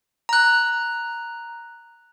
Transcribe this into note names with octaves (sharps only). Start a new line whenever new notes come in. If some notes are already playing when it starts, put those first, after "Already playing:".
A#5 F#6